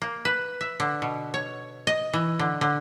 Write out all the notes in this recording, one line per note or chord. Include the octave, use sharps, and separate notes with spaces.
A#3
B4
E5
D3
B2
C#5
D#5
E3
D3
D3